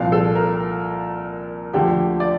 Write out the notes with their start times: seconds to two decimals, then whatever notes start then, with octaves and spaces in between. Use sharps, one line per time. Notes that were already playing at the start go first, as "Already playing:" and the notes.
Already playing: C2 A#2 F3 F5
0.12 A4
0.35 A#4
1.73 D2 D3 F3 G4
2.20 D5